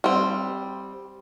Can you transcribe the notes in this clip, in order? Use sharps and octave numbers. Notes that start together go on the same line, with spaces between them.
G3 C4